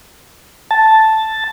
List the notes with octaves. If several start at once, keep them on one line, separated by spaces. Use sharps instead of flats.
A5